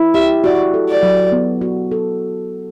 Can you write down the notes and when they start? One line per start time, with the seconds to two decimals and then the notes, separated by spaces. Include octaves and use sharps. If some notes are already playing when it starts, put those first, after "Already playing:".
Already playing: E4
0.14 G4 E5
0.44 F#4 D5
0.74 A4
0.89 D5
1.03 F#3
1.32 B3
1.61 F#4
1.91 A4